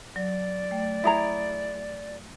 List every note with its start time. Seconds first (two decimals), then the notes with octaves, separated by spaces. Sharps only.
0.16 F#3 D5
0.71 A3 G5
1.04 E4 G#4 A#5